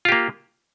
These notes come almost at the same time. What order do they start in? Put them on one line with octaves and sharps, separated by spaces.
F4 G4 A#3